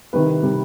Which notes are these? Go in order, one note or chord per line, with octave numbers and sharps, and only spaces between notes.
C2 C3 D#3 G3 B4
C3 D#3 G3